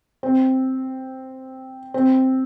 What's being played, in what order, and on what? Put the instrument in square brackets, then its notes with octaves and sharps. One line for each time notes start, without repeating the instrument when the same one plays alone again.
[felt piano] C4
C4